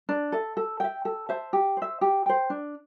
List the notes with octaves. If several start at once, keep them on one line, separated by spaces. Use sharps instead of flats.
D4
A4 E5
A4
E5 G5
A4
C5 E5 A5
G4
C5 E5
G4
C5 G5
D4